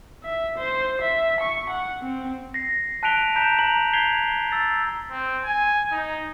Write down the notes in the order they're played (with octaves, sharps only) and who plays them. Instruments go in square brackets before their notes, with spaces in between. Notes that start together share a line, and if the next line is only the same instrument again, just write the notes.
[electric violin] E5
C5
E5
C#6
F#5
C4
[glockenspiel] A#6 C7
A5 F#6 B6 D7 F7 G7
A#5 G6 B6 D7 E7 F7
A#5 F7 F#7
G6 G#6 B6 C7 F7 G7
E6 A6 C7
[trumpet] C4
G#5
D#4